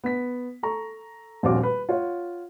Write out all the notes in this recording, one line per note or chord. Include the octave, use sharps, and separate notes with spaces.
B3 B6
A4 A#5 C#6
D#1 A#1 C4 F4 F#4 D6
B4
F4 C#5 F#5